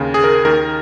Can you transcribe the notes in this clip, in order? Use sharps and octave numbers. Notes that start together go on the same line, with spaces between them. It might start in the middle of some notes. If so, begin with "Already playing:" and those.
Already playing: D#2 C#3
G#4
A#4
D#2 D#3 A#4